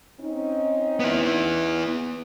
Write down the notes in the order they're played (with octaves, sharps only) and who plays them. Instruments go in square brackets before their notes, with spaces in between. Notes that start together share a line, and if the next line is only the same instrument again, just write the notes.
[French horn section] C4 C#4 D#4
[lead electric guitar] B3 E4